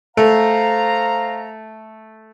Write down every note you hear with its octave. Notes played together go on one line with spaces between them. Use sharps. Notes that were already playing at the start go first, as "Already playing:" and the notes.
A3 C5 F5 A#5